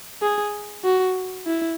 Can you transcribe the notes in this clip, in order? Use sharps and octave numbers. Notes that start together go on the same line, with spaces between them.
G#4
F#4
E4